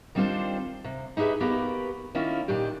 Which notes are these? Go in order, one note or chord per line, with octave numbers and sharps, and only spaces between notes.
D#3 G3 C4 D4 F4 C5
C3
D#4 G4 G#4 B4 E5
A#3 B3 F#4 G4 A#4
D#3 A#3 C#4 E4 F4
A#2 D#3 D4 G4